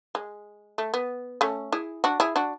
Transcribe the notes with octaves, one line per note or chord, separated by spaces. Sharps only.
G#3
A3
B3
A3 C#4
E4 G#4
D4 F#4
E4 G#4
D4 F#4